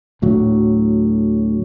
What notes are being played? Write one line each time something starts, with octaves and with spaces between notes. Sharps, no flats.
D2 A2 F#3